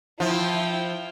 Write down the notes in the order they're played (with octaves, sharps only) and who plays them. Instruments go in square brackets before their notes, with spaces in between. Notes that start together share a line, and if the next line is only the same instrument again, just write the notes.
[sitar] F3 [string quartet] E4 G5